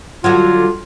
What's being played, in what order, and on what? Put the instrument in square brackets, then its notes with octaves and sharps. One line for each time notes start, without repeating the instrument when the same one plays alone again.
[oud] D3 F#3 [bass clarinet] F4